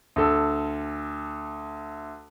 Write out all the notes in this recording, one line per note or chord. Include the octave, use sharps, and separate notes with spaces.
D2 A4